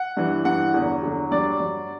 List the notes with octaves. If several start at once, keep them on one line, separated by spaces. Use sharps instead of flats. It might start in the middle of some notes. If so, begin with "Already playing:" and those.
Already playing: F#5
G2 E3
G2 E3 F#5
E2 D3 F#3
E2 D3 F#3
G2 F#3 D5
G2 F#3